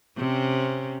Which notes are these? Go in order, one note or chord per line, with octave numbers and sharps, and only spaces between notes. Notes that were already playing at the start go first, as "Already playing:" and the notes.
C3 C4 C#4